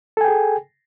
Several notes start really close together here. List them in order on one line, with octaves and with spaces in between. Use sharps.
A4 G#5 G5 G#4